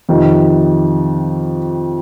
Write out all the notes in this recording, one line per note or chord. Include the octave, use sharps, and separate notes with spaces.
F2 C3 D#3